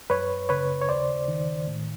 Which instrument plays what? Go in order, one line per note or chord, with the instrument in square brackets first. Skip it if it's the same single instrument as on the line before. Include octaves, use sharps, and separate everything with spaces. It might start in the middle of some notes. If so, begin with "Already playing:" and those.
[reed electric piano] F#2 B4 C#5
C#3 B4 C#5
C#5
D#2 C5 D5
D#3
A2